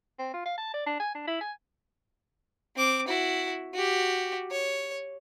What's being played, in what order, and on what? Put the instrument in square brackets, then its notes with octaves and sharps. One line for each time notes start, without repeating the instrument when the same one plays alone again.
[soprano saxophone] C4
F4
F5
A5
D5
D4
G#5
D4
E4
G#5
[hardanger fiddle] C4 D6
E4 F#4
F#4 G4
C#5